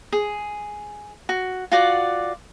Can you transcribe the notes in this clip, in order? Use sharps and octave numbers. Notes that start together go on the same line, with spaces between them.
G#4
F#4
F4 F#4 D5 F#5